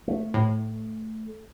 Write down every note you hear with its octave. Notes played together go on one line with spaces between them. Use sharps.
A3
A2